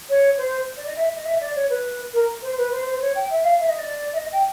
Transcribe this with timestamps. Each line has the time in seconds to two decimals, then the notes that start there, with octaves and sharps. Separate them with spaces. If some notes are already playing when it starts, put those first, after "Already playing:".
0.09 C#5
0.37 C5
0.77 D5
0.86 D#5
0.96 E5
1.16 D#5
1.25 E5
1.41 D5
1.55 C#5
1.69 B4
2.13 A#4
2.42 C5
2.57 B4
2.71 C5
2.85 C5
2.96 C5
3.01 C#5
3.15 G5
3.30 E5
3.44 F5
3.59 E5
3.69 D#5
3.79 D5
4.13 E5
4.17 D#5
4.32 G5